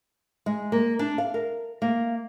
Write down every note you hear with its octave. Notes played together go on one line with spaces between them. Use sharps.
G#3
A#3
D4
F5
A#4
A#3